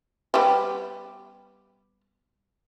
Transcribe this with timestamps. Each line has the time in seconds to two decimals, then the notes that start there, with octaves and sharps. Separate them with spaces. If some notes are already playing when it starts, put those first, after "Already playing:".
0.34 G3 B3 G4